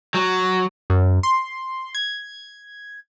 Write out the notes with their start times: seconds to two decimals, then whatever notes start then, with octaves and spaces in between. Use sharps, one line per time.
0.14 F#3
0.90 F#2
1.23 C6
1.95 G#6